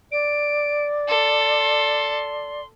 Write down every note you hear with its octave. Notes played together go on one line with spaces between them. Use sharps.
D5 D7
A4 C6